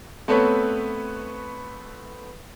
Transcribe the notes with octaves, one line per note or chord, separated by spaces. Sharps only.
A3 B3 C4 A4 B4 C#5